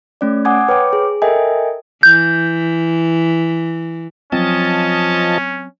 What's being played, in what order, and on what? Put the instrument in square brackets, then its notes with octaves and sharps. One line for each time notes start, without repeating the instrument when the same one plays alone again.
[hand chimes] A3 C#4 D5
F#5 G#5 D6 D#6 G#6
B4 C#5 G5 D6
G#4
A4 A#4 D#5 E5 G5 G#5
[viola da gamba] E3 [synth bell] G6
[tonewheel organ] F3 D#5 A5 [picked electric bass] F#3 C4 [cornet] C#4